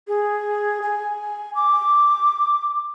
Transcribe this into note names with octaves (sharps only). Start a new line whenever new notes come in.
G#4
G#5
D6